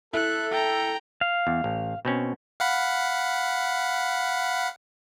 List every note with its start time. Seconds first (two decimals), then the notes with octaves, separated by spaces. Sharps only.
0.13 E4 A4 F#6
0.51 G5 A#5
1.21 F5
1.47 E2
1.64 A1
2.05 B2 C4 C#4
2.60 F5 F#5 B5